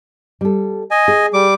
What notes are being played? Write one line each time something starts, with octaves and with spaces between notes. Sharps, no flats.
G3 A4
D#5 G#5
G#4
G3 D6